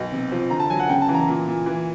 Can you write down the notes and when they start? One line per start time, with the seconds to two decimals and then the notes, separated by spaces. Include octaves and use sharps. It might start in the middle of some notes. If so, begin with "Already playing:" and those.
Already playing: B1
0.12 C3
0.32 F3
0.50 D3 A#5
0.60 A5
0.70 F#3 G#5
0.80 F#5
0.89 C#3 G5
1.02 A5
1.09 E3
1.14 A#5
1.28 A#2
1.48 A#2
1.66 E3